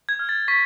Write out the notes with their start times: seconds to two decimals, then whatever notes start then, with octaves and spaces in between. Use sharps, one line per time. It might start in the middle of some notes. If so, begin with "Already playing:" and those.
0.09 G#6
0.19 F6
0.29 A6
0.48 C#6 B6